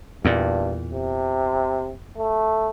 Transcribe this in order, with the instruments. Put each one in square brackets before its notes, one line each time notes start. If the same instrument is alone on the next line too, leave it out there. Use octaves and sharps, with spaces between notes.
[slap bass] E2 A#2 [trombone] G2
[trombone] C3
A3